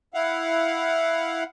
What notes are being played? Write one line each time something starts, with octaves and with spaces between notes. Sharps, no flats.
E4 F5 F#5